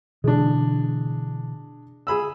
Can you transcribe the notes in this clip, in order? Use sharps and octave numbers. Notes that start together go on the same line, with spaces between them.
B2 D3 E3 G#3 D4
G#4 B5 E6